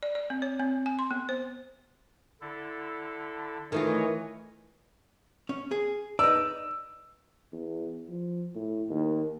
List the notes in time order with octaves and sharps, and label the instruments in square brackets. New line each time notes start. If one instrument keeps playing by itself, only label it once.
[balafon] D5
D5
C4
C#5
C4
G#5
C6
B3
C5
[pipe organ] D3 E4 A4
[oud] D#3 A3 F4 [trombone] E3 [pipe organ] C#5 D#5 G#5
[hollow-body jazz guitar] C#4
G#4
[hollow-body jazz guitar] D#4 B4 D5 [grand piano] E6
[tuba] E2
F3
A2
D#2